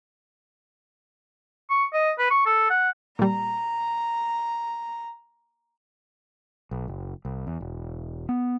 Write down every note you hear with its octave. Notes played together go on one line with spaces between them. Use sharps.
C#6
D#5
B4
C#6
A4
F#5
A#2 G3 A#5
B1
F#1
C2
E2
E1
B3